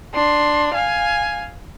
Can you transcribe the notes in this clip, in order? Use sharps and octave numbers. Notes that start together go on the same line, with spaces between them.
D4 C6
F5 G#5